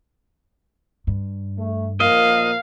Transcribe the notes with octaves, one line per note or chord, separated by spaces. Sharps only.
G2
A3
A#2 F3 A#3 D#5 F5